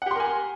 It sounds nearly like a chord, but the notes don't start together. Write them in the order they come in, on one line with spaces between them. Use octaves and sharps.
F#5 G4 C6 A#4 G#5